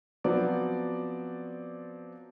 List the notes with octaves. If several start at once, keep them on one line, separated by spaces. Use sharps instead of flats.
F3 F#3 B3 C4 D5